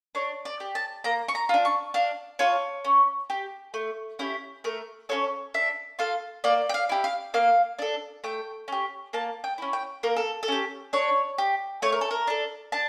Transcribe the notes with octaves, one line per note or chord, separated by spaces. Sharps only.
D4 C#5
D5
G4
A5
A#3 A#5
C#6
A#5
D4 F4
C#6
D4 F5
F4 A4 C#5
C#4
G4
A3
C#4 E4 G4
A3 A#4
C#4 F4 A4 C#5
D4 E5
F4 A4 F5
A#3 D5
G5
F5
E4 G4
F5
A#3 F5
D4 A4
A3 G5
C#4 G4
A#3 A5
G5
C#4 E4
G5
A#3 A#4
A4
A4
C#4 G4
D4 C#5
G4
A3 C#5
A#4
A4
A#4
D4 A4
D4 A5